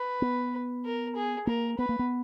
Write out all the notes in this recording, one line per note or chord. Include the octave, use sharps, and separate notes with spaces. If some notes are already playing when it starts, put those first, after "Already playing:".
Already playing: B4
B3
A#4
G#4
A#3 A#4
B3 B4
A#3
B3